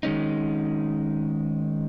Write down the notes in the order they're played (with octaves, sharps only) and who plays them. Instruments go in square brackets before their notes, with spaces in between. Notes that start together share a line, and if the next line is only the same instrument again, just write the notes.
[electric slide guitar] D#3 G#3 C#4 D#4